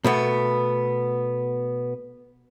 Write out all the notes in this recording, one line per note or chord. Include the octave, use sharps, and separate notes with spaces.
B2 A3 B3